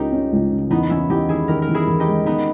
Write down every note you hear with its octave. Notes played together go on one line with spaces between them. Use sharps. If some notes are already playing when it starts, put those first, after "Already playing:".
Already playing: C#2 C#4 D#4 G4 A#4
C#4
C#2
C#3
E2 B3 D#4
E2 C#4 E4
E2 D#4 G4
D#3 E4 G#4
D#3 G4 A#4
A#4
E2
E4 G#4
E2
D#4 G4
G#3
D#3 B3 D#4